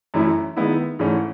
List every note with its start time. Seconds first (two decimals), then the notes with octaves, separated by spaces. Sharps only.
0.14 F#2 E3 A3 C#4 E4
0.56 D#3 G#3 B3 E4
0.99 G#2 E3 A3 C#4